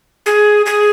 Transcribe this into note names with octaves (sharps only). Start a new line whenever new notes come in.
G#4
G#4